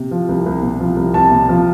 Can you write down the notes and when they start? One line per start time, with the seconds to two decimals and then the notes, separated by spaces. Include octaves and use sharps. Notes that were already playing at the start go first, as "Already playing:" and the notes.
Already playing: C3
0.11 F3
0.29 C2
0.46 C2
0.63 C3
0.80 F3
0.96 C2
1.14 C2 A5
1.31 C3
1.49 F3